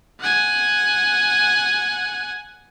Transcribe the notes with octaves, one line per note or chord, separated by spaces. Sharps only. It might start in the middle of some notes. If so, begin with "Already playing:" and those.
F#5 G#5